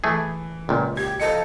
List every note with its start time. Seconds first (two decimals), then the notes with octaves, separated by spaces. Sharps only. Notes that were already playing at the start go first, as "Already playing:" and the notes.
0.04 E3 A3 G#4
0.69 C#2 A#2
0.97 G4 G#6
1.20 F3 A4 D#5 C#7